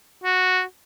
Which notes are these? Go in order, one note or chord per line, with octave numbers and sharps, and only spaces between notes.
F#4